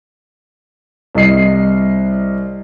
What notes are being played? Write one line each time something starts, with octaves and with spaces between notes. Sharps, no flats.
C2 D#5 C7